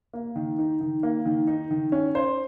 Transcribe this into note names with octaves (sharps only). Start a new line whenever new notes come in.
A#3
D#3
D#4
D#3
A#3
D#3
D#4
D#3
C#4
C5